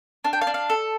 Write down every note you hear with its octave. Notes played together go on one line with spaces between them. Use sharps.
D4 F5
G5
F5
D4
F5
A4